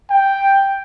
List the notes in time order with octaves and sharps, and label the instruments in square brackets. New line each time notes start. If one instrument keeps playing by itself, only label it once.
[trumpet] G5